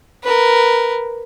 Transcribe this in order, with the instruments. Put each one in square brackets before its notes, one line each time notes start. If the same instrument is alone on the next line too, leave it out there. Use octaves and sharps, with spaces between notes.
[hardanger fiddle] A#4 B4